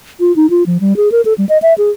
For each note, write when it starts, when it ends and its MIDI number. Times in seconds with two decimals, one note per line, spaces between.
0.20 0.34 65
0.36 0.49 63
0.50 0.66 65
0.66 0.78 53
0.80 0.96 55
0.97 1.11 68
1.12 1.21 70
1.25 1.33 69
1.38 1.45 55
1.49 1.58 75
1.62 1.74 76
1.78 1.90 68